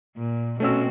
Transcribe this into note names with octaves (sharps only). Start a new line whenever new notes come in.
A#2
B2 A3 C4 C#4 F#4 E6